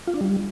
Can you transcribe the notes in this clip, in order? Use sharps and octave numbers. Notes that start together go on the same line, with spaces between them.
F4
D4
G3